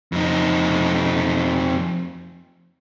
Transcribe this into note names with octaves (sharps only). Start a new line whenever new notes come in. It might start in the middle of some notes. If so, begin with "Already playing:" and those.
F2 D#4